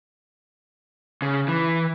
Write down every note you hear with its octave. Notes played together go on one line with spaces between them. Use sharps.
C#3
E3